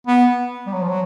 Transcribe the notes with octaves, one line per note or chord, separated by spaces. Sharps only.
B3
G3
F#3
F3
F#3